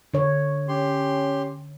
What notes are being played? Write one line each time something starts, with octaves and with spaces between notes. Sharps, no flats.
D3 C#5
C#4 G4 C6